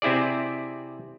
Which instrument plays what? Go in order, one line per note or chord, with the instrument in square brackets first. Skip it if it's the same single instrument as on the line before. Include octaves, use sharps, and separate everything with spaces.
[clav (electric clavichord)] C3 C4 E4 G#4 D5